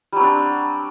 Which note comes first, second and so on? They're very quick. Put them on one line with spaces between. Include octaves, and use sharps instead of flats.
G3 F#3 C4 D4